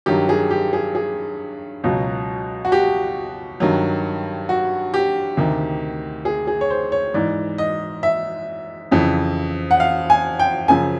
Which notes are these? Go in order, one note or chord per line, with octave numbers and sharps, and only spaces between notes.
G2 D#3 F#3 G4
G#4
G4
G#4
G#4
C#2 B2 F#3
F#4
G4
G2 D#3 F#3
F#4
G4
D2 C3 D#3
G#4
G#4
C#5
C5
C#5
G#2 E3 D5
D#5
E5
F2 C#3 E3
F#5
F5
G#5
G5
F#2 C#3 F3 G#5